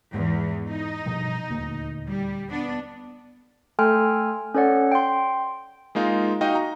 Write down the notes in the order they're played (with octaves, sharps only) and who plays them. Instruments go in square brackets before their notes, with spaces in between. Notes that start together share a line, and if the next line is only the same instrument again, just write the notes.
[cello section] E2 [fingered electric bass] G#2
[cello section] D#4
[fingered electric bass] G2 B2 F3
D#1 D2 A#3
[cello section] G3
B3 D4
[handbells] A3 A4 G5 G#5 C6 F6
C#4 A4 C#5 D5 F#5
G5 C6
[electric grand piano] G#3 A#3 D#4 F4
D#4 F#4 D#5 F5 G5
A#5